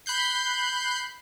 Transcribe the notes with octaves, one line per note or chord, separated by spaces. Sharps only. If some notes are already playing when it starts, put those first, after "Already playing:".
B5 F#6 G6 C7